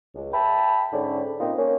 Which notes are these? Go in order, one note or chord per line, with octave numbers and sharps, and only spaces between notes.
C#2
E5 G5 A5 B5
G#2 D3 C#4
A#2 A#3 C4 D#4 F4
A#3 C#4